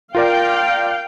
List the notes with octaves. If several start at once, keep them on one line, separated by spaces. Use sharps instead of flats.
F4 A#4 D5 F5 G5